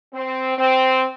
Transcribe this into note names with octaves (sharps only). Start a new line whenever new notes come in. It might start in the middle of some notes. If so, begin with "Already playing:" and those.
C4
C4